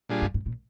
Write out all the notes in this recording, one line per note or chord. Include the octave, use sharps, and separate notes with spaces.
A#2 G3 D4 F4 G#4
G2
G#2
A#2